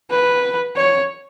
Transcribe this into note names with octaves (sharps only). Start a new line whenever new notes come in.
B4
C#5